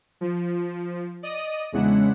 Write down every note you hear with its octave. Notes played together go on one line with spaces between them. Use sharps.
F3
D5 D#5 D#6
E2 C#3 G#3 D4 E4 F#5